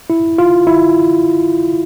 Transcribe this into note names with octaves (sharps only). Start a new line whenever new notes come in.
E4
F4
E4